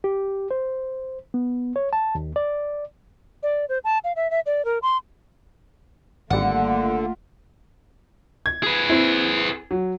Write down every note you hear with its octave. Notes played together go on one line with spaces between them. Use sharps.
G4
C5
B3
C#5
A5
D#2
D5
D5
C5
A5
F5
E5
E5
D5
A#4
C6
G#1 D3 G3 A3 A#3 F4 F#5
G#6
G#4 B4
C4 E4
F#3